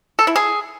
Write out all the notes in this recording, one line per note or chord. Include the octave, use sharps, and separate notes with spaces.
A4
E4
G#4